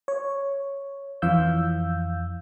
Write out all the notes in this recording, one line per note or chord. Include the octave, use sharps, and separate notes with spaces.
C#5
F2 E3 F5 E6 G6